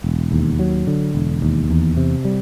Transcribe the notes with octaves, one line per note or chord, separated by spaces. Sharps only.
E1
D#2
F#3
D3
E1
D#2
E2
C3
G3